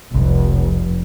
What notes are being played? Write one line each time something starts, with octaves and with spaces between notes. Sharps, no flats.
F1 C2